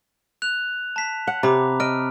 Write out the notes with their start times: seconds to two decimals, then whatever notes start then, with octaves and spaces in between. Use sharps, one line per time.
0.42 F#6 F7
0.96 A5 B6
1.27 F#5
1.43 C3 A#5 B5 D6
1.80 D#5 F6 D7